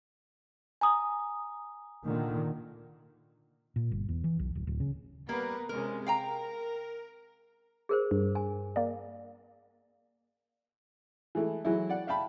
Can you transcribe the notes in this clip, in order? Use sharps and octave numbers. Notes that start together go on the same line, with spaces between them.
G#5 A#5 D#6
A#2 D3 D#3
A#2
G1
E2
E3
B1
D1
D1
C#3
G3 A#3 B3 A#4 B4
C3 G#3 C#4 A#4
A#4 F5 G5 A#5
G#4 A#4 C5
G2
G#5
A#3 D5
E3 G#3 A3 E4
E3 F#3 G#3 E4
D5 F#5
E5 F5 G5 A5 B5